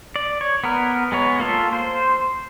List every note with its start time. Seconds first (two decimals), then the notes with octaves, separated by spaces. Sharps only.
0.16 D5
0.41 C#5
0.64 B3 A#4
1.12 G#3 B3 C#5
1.40 A#3 F4 A4
1.73 C5